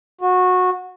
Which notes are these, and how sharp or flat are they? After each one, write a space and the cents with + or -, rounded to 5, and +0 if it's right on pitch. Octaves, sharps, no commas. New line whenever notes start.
F#4 -20